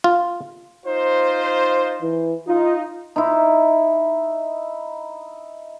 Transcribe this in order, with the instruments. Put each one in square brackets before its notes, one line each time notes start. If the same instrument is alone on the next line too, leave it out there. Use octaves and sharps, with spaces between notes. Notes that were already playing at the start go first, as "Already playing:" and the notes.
[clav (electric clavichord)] F4
[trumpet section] D#4 F4 C5
[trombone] E3
[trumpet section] D#4 [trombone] F4
[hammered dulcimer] D#4 E4